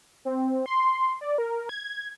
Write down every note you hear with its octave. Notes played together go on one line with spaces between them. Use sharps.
C4
C6
D5
A#4
G#6